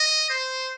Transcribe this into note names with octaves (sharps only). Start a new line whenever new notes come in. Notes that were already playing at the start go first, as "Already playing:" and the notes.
Already playing: D#5
C5